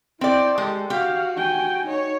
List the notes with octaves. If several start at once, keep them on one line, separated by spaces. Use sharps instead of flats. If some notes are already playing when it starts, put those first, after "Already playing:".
C4 E4 D5 G5
G#3 G4 A4
F#4 G4 F5
G5 G#5
D#4 C#5